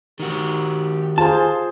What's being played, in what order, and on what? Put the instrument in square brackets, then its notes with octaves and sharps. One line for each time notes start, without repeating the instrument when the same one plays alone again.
[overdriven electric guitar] D#3 F#4 [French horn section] G4
[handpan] F4 G#4 C5 [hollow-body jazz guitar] A5